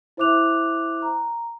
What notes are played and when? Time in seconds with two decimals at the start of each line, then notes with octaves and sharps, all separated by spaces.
0.17 E4 C5 E5 D6 F#6 F7
1.02 A#5